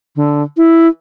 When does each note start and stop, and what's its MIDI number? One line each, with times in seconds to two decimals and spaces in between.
0.16 0.43 50
0.57 0.88 64